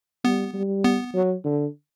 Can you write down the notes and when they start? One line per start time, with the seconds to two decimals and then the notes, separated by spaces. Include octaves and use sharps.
0.25 G3 B3
0.54 G3
0.84 B3
1.15 F#3
1.45 D3